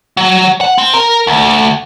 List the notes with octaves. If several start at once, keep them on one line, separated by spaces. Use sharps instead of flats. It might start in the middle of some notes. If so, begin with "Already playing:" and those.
F#3
F#5
C4
A#4
D2